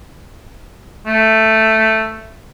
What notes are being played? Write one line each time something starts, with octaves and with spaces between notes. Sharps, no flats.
A3